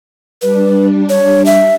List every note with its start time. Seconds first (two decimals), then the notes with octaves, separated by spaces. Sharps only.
0.42 G3 D4 B4
1.10 C#5
1.46 E5